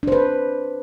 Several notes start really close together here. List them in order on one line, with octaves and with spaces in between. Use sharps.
D4 C5 B4